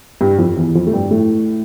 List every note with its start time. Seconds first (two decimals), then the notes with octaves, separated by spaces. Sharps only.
0.21 G2 G3
0.39 F2 F3
0.57 E2 E3
0.75 F2 F3
0.87 A3
0.93 G2 G3
1.11 A2 A3